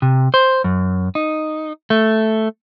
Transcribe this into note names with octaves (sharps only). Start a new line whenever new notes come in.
C3
C5
F#2
D#4
A3